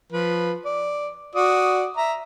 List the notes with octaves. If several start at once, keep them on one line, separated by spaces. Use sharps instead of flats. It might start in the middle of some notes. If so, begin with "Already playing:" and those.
F3 B4
D5
F#4 D5 D#6
E5 A#5